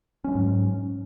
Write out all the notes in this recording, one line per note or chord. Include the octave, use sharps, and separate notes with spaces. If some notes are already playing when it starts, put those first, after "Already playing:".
G#2 F#3 G#3 C#4